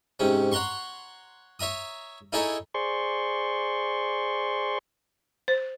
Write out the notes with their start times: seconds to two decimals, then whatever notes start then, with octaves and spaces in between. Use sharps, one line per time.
0.20 G#2 C3 C#4
0.52 C#5 F#5 A#5 C6 C#6
1.59 C#5 E5 A#5 D#6
2.33 D#4 E4 G#4 A4 C#5 D#5
2.74 G#4 C5 D5 C6 C#6
5.48 C5